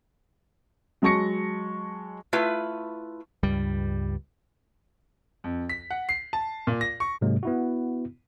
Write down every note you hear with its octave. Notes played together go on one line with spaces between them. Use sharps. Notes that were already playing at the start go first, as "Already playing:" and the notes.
F#3 G#3 A5 C#6 A#6 C#7
A3 E4 F4 B4
C#2 G2 G3
F2
B6
F#5
C7
A5
A#2
A#6
C#6
G#2 C3 F#3 G#3 A#3
B3 E4 F#4